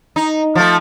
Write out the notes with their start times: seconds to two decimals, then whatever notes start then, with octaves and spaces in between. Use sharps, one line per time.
0.16 D#4
0.55 F3 A3